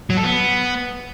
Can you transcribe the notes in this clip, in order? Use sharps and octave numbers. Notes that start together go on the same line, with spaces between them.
F#3
A4
B3